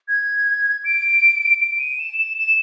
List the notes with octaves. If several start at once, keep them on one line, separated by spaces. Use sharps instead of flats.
G#6
D7
D7
D#7
E7
E7
E7